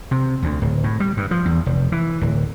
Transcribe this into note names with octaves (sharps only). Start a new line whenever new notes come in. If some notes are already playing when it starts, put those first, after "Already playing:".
C3
D2
D1
A2
G3
G2
F3
E2
F1
E3
D1